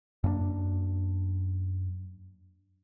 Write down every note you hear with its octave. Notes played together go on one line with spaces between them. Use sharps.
F#2 A#3 C4 D4